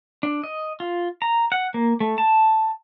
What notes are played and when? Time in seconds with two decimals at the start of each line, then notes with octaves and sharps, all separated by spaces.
0.23 D4
0.44 D#5
0.80 F4
1.22 A#5
1.52 F#5
1.74 A#3
2.00 A3
2.18 A5